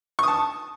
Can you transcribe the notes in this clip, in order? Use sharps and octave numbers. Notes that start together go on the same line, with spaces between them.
A5 C#6 D#6